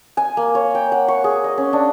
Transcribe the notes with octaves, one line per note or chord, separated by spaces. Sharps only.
G#5
A#3
C#5
G5
F#5
C#6
G#4
D#5
C#4
D4